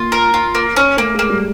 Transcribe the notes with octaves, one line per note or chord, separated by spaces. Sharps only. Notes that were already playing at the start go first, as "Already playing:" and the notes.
Already playing: A#3 F4
A#4
F4
A#3
C#4
A3 A#3
G#3
A#3
G3